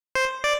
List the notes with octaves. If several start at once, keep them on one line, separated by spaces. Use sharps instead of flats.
C5
D5